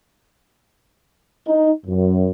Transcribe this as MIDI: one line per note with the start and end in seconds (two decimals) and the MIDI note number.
1.48 1.71 63
1.86 2.31 42